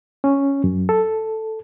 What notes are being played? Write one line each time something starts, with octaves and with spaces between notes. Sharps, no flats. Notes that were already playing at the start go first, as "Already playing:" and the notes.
C#4
F#2
A4